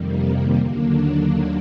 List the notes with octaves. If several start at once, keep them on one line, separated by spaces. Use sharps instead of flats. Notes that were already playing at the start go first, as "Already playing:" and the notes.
Already playing: F2 C3 D#3 G3 A#3
D#2 D3 F#3 A#3 D4